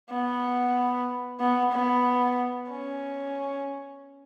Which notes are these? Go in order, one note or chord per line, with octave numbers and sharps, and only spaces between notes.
B3
B3
B3
C#4